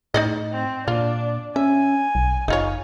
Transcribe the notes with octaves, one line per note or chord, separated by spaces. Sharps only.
A2 D#4 D5 D#5
C4
A#2 D4 F4
C#4 E5 G#5
B1
F#1 D#4 F4 C#5